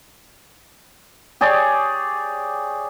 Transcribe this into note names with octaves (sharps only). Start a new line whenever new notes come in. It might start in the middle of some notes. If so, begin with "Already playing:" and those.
G4 G#4 C#5 D5